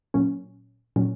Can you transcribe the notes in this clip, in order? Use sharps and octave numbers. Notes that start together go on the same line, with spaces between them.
A#2 F#3 C#4
A#2 F#3 C#4